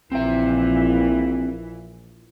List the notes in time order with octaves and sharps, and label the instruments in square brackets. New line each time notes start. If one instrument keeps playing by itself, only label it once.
[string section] A#1 E3 [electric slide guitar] C4 E5